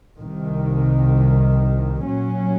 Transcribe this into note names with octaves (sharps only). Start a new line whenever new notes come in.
C2 C3 D#3
A#2 F#3 C#4